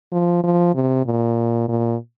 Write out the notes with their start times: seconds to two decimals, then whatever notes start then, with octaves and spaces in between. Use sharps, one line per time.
0.12 F3
0.43 F3
0.75 C3
1.06 A#2
1.68 A#2